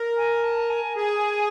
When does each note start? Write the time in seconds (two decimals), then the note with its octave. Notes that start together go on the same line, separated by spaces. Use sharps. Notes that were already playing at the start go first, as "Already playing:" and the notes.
Already playing: A#4
0.17 G#5
0.44 A5
0.70 G#5
0.96 G#4 G#5